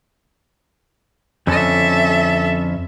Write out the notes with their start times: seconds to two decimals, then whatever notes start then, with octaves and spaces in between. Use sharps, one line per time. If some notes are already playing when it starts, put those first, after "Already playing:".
1.47 F2 D3 C#4 A4 E5